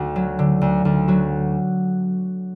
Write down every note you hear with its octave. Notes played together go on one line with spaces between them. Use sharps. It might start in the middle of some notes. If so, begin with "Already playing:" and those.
Already playing: D2 F#4
F#3
D3
D2
D2
F#3 F#4